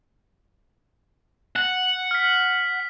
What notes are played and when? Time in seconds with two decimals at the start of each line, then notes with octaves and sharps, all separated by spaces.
1.56 F#5
2.11 F6 B6